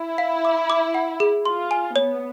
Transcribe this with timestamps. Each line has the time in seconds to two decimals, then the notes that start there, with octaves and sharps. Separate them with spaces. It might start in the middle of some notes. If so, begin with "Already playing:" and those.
Already playing: E4
0.18 F5
0.45 D6
0.70 D6
0.94 F#5
1.20 G#4
1.45 F4 C6
1.71 G#5
1.96 B3 C#5